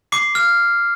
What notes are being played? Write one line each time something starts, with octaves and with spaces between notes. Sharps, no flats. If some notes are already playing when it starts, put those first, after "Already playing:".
D6 C7
F6